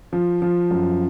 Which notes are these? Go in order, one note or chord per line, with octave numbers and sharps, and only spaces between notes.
F3
F3
F#2